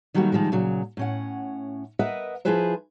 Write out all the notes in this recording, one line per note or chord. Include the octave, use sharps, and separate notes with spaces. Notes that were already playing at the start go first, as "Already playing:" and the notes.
D#3 F#3 G3 A3 A#3 F#4
D#3 F3 G3 G#3
A#2 C#3 F#3
A2 C#4 F#5
A#4 B4 D#5 E5 F#5
F3 E4 F4 G#4 B4 C5